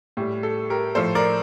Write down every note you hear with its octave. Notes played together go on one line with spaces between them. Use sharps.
A2 G3 G4
A4
G4 A#4
A2 F3 A4 C5
A#4 D5